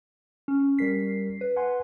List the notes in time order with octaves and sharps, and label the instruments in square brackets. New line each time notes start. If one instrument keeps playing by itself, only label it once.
[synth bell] C#4
[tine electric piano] G3 A#4 B6 [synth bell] C7
[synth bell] B4
[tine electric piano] F#5 G#5 C6